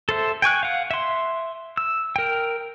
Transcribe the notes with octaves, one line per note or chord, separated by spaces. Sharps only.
A4 C5 E5
G5 G#5 C#6 F#6
F5 F#5
E5 C6
E6
A#4 G5